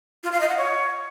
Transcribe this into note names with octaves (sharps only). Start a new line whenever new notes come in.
F4
F5
D#5
F#5
C#5